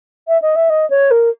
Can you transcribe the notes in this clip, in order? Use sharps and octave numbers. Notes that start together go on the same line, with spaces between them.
E5
D#5
E5
D#5
C#5
A#4